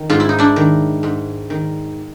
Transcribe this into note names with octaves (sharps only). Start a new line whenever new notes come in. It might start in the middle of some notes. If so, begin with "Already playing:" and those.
Already playing: D#3
G#2 F4
E4
D#4
D4 E4
D#3
G#2
D#3